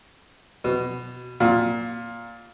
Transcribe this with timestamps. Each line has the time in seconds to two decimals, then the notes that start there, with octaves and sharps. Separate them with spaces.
0.64 B2
1.40 A#2